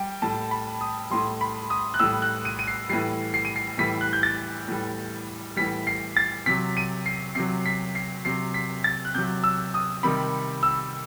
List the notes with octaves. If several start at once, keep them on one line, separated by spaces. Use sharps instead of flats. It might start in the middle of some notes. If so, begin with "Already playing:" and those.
Already playing: G3 G5
A2 G3 A5
B5
D#6
A2 G3 C6
B5
D#6
F#6
A2 G3 E6
F#6
D#7
D#7
C7
A2 E3 G3 C7
C7
D#7
C7
A2 E3 G3 B6
F#6
G6
A6
A2 E3 G3
A2 E3 G3 B6
C7
A6
C3 F#3 B6
D#7
C7
C3 F#3 C7
B6
C7
C3 F#3 C7
B6
A6
F#6
C3 F#3 G6
E6
D#6
C3 D#3 G3 B5
E6